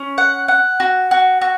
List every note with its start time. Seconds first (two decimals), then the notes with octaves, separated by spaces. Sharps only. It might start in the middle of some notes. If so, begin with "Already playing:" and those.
Already playing: C#4
0.18 F#5
0.48 F#5
0.80 F#4
1.11 F#4
1.41 F#4